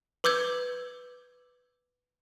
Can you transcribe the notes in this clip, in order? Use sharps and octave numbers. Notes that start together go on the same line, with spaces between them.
B4 D6 E6 G6 G#6